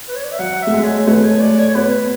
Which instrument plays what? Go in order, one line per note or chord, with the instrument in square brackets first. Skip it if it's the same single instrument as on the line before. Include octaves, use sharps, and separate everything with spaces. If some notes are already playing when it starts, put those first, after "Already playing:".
[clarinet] B4
C#5
D5
E5
[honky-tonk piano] F#3 [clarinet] F#5
[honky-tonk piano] A3 [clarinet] E5
[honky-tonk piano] G#3
[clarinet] C#5
[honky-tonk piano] A3 [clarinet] B4
[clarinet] C#5
D5
C#5
C#5
[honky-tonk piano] B3 [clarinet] B4